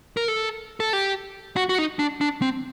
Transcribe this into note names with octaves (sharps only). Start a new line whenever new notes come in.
A#4
A4
A4
G4
F#4
F#4
D#4
D4
D4
C4